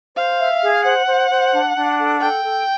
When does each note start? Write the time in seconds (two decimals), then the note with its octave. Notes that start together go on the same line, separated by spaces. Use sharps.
0.15 C5 F5
0.39 E5
0.62 G#4
0.84 C5 F#5
1.07 C5
1.30 C5
1.52 D4
1.75 D4
1.98 A4
2.20 A4 G5
2.44 A4